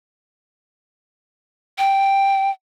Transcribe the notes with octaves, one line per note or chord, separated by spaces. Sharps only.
G5